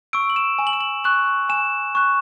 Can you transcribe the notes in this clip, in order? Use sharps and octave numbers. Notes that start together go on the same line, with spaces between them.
C#6 E6 D7
F#7
E7
G#5
F#7
E7
F#7
C#6 F#6 F#7
G#5 E7
C#6 F#6